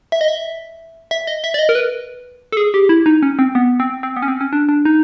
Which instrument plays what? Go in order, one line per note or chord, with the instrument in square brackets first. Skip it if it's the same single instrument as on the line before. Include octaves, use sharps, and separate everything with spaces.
[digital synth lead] E5
D#5
E5
E5
D#5
E5
D5
D#5
A#4
B4
A4
G#4
G4
E4
D#4
C#4
C4
B3
C4
C4
B3
C#4
C4
C#4
D4
D4
D#4